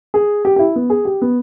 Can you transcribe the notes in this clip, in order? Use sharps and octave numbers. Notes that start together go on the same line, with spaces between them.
G#4
G4
G4
E4
B3
G#4
G4
B3